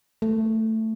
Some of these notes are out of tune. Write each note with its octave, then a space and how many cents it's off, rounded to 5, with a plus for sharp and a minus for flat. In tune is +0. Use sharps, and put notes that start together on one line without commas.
A3 +10